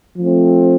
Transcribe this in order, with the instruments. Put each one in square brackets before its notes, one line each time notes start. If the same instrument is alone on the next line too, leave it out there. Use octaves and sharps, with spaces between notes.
[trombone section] F3 A3 C4